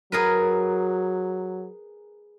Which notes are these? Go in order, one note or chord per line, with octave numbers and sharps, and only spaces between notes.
F#3 G#4 A#4 B4